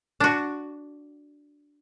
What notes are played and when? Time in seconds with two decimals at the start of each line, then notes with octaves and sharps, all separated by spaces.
0.20 D4 F#4